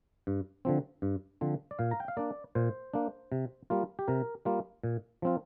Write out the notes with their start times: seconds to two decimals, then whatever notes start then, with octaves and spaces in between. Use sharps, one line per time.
0.27 G2
0.65 D3 F3 C4
1.02 G2
1.41 D3 F3 C4
1.71 D5
1.79 A#2 F5
1.91 A#5
2.00 G5
2.08 F5
2.17 A#3 D4 D5
2.55 A#2 C5
2.94 A#3 D4
3.32 C3
3.70 G3 A#3 F4
3.99 G4
4.08 C3 A#4
4.45 G3 A#3 F4
4.84 A#2
5.22 F3 C4 F4